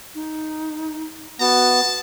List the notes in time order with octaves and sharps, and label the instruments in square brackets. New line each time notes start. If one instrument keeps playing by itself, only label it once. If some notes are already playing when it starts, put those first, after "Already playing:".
[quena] D#4
[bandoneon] B3 [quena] F#4 [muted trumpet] A5